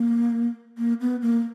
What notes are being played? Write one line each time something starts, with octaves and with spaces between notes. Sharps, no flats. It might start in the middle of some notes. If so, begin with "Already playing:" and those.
Already playing: A#3
A#3
B3
A#3